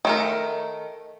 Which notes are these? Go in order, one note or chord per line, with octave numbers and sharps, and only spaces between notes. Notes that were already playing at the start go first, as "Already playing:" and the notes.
D#3 A3 A#4